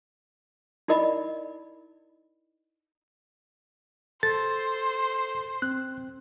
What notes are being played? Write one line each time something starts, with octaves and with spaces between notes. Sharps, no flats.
D#4 E4 A#4 D5 D#5 B5
A4 C5 A6
C4 F#6